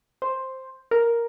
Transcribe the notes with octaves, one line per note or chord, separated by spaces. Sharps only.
C5
A#4